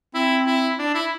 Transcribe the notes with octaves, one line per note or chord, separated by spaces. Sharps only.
C4 E4
E4
D4
E4